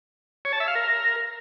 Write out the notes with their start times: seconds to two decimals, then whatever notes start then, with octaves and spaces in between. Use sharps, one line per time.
0.45 C#5
0.53 A5
0.60 E5
0.68 F5
0.75 A#4